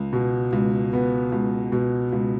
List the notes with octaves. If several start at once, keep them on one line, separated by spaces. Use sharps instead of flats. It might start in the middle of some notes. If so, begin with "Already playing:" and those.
Already playing: C#2
B2
C#2
B3
C#2
B2
C#2